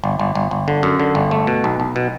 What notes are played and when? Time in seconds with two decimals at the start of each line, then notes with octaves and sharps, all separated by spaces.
0.04 G1
0.19 G1
0.35 G1
0.51 G1
0.68 D3
0.83 F#2
1.00 D3
1.15 G1
1.31 A3
1.47 B2
1.64 B1
1.80 B1
1.96 B2